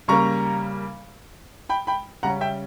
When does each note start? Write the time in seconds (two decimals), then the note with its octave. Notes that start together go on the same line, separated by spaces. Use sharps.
0.08 C#3 G3 A#3 A#5 C#6
1.69 G5 B5
1.87 G5 B5
2.23 C#3 G3 C#4 F#5 A#5
2.41 E5 G5